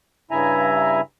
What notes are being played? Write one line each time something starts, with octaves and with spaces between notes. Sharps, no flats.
G2 C#3 E4 E5 G#5 A#5